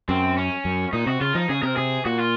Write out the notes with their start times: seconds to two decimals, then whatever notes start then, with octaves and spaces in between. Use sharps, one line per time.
0.09 F#2 C4
0.37 C#4
0.65 F#2
0.93 A#2 D#4
1.07 C3 F#4
1.21 C#3 F4
1.35 F3 D#4
1.49 C#3 G#4
1.63 C3 A#4
1.76 C3 G#4
2.05 A#2 F#4
2.19 F4